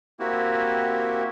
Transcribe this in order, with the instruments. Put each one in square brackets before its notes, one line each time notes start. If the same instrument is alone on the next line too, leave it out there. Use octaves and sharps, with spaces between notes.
[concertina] A#3 C4 E4 F#4 G4